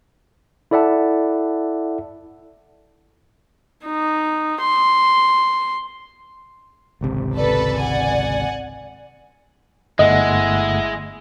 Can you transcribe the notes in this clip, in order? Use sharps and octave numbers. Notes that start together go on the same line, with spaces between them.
E4 A4 D5 E5 F#5 A5
D#4
C6
G#1 C#2 C3
A4 B4 D5
F#5 G#5
G1 G#3 A3 E4 D#5 F#5